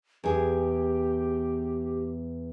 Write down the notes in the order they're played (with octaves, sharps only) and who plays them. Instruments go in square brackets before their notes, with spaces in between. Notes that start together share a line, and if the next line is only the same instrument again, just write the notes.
[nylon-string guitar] E2 G#4 [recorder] G4